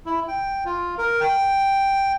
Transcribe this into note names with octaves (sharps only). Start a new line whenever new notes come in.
E4
G5
F4
A#4
G5